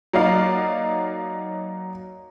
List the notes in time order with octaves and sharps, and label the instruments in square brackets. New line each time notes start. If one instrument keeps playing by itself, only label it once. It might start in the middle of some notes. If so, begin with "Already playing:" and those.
[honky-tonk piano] F#3 A#3 D#4 D5 F5